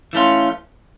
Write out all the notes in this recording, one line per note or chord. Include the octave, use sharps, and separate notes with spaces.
E3 A3 C#4 F4